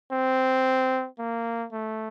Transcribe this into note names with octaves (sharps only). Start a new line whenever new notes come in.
C4
A#3
A3